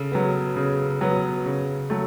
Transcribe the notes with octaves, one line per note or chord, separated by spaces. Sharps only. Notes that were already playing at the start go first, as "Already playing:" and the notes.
Already playing: C#3 A4
F#3 B3
C#3
F#3 B3
C#3
F#3 A3